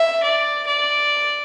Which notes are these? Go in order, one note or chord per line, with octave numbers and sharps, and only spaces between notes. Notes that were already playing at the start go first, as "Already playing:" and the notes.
Already playing: E5
D5
D5